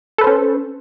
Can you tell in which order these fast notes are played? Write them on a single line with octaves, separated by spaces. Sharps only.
A4 B4 C5 C#4